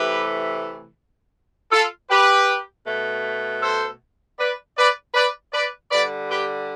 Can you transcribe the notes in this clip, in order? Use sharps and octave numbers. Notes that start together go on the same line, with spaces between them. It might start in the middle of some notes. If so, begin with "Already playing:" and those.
Already playing: C3 E3 A3 G4 B4
F4 A4
G4 B4
B2 A3
A4 C5
B4 D5
B4 D5
B4 D5
B4 D5
D3 G3 B4 D5
G4 B4